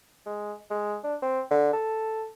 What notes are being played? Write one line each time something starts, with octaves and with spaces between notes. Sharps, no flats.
G#3
G#3
D4
C4
D3
A4